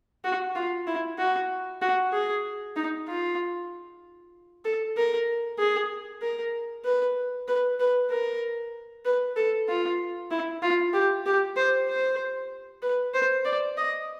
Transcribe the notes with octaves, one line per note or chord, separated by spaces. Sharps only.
F#4
F4
E4
F#4
F#4
G#4
D#4
F4
A4
A#4
G#4
A#4
B4
B4
B4
A#4
B4
A4
F4
E4
F4
G4
G4
C5
C5
B4
C5
D5
D#5